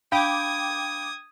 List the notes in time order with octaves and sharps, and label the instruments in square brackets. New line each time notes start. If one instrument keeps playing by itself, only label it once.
[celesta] D4 F5 B5 [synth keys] G5 D6 [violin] D#6 G#6